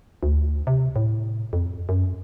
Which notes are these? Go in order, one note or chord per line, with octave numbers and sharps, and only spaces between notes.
D2
C3
A2
F2
F#2